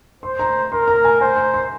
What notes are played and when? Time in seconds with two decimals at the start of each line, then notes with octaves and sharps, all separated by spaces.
0.23 C5 C6
0.39 A#5
0.72 A#4 C6
0.88 A#5
1.04 G#5
1.21 C5 G#5
1.37 A#5
1.54 C6